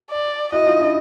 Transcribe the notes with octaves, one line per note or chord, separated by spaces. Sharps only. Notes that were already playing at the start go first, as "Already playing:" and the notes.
D5
E4 F#4 D#5
D#4 F4
D4 E4